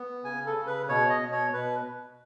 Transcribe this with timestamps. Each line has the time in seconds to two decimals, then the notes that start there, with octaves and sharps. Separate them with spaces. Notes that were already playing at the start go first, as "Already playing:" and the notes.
Already playing: B3
0.24 C#3 G#5
0.46 A4
0.56 C#3
0.67 B4
0.89 B2 C#5
1.09 D#5
1.21 B2
1.32 C#5
1.53 B2 B4